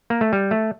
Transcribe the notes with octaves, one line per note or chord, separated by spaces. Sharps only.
A#3
A3
G3
A3